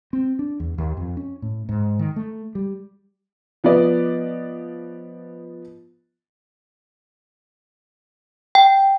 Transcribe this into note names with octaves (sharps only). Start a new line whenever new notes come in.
C4
D4
E2
D#2
F2
C#4
A2
G#2
D#3
A3
G3
F3 B3 B4 D5 D#5
G5